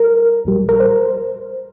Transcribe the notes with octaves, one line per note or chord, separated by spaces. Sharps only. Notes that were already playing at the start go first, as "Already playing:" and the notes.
Already playing: G3 A#4
A#1 A#2 G3
A#4
C5